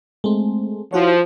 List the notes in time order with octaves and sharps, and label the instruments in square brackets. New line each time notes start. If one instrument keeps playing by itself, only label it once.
[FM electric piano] G#3 A3 C4
[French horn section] F3 [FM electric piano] E4 F#4 C#5